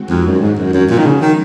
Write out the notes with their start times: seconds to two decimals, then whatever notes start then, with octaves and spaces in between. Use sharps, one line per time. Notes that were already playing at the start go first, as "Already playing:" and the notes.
Already playing: D#3 G#3 C4 F#4
0.10 F2
0.26 F#2
0.41 G#2
0.58 F#2
0.73 F#2 F3 G#3 C#4 F#4
0.90 A#2
0.98 D#3
1.06 C#3
1.22 D#3